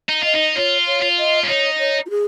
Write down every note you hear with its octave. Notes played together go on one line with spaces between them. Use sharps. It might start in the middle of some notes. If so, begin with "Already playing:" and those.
D#4
F4 D#5
D#4
F4 C#5
C#5
F4
D#5
C#4
D#4 C#5
C#5
F4
G#4